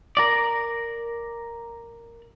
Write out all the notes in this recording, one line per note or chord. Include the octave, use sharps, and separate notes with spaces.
A#4 D5